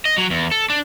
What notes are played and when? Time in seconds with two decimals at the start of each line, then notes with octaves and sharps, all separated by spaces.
0.05 D#5
0.17 F#3
0.30 E2
0.51 A4
0.70 D4